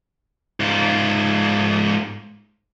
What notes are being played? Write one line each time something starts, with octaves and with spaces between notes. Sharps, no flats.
G#2 F4